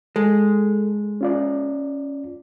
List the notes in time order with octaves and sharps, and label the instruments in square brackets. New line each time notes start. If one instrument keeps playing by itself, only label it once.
[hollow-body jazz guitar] G#3 [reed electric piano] A4
[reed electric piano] C#4 F4 D5